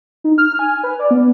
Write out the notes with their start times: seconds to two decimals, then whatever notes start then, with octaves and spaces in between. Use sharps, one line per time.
0.24 D#4
0.38 F6
0.59 G#5
0.83 B4
0.99 D5
1.11 B3